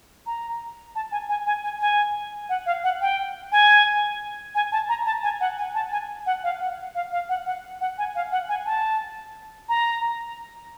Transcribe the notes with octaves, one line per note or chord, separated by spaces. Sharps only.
A#5
A5
G#5
G#5
G#5
G#5
G#5
F#5
F5
F#5
G5
G#5
G#5
A5
A#5
A5
G#5
F#5
G#5
A5
G#5
F#5
F5
F#5
F5
F5
F#5
F#5
F#5
G#5
F5
F#5
G#5
A5
A#5